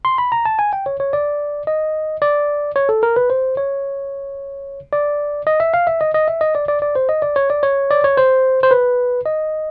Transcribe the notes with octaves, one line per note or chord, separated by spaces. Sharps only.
C6
B5
A#5
A5
G#5
G5
C#5
C#5
D5
D#5
D5
C#5
A4
A#4
B4
C5
C#5
D5
D#5
E5
F5
E5
D#5
D#5
E5
D#5
D5
D5
D5
C5
D#5
D5
C#5
D5
C#5
D5
C#5
C5
C5
B4
D#5